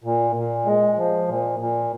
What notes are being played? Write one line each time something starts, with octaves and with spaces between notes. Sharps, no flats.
A#2
A#2
G#3
F3
A#2
A#2